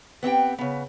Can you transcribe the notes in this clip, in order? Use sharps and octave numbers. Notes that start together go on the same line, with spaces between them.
B3 C4 G4 G5
C#3 B3